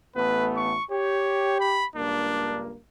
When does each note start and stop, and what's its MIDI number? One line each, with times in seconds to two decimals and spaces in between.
0.16 0.76 33
0.16 0.76 57
0.16 0.76 59
0.16 0.49 71
0.56 0.84 85
0.91 1.84 67
0.91 1.56 73
1.60 1.86 83
1.96 2.77 37
1.96 2.77 43
1.96 2.77 58
1.96 2.61 62